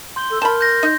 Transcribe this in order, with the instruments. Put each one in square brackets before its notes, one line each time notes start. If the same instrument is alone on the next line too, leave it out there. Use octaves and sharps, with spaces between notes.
[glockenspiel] C6 G6 G7
[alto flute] A4
[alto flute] A#4 [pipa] A5 B5
[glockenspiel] G6 A#6
[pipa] D#4 [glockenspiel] G6 A#6